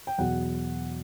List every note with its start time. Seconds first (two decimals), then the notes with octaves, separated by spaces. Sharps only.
0.07 G5
0.18 E2 B2 F#3 F#5